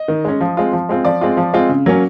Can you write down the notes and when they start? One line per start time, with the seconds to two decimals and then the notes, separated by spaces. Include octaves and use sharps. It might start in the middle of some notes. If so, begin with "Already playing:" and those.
Already playing: D#5
0.08 D#3
0.25 G#3 C#4
0.41 F3
0.57 G#3 C4 F4
0.73 F3
0.89 G#3 C4 F4
1.05 F3 D5
1.21 G#3 C4 F4
1.37 F3
1.54 G#3 C4 F4
1.69 C#3
1.86 F#3 A#3 C#4